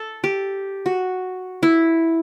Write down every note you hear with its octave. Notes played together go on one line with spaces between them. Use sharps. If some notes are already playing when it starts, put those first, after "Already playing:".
Already playing: A4
G4
F#4
E4